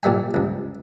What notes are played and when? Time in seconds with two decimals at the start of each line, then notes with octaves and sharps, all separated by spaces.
0.03 B1 A#2 G3 E5 G#5
0.34 C#2 G2